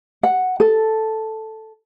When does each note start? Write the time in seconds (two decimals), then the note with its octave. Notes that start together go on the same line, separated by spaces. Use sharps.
0.23 F#5
0.60 A4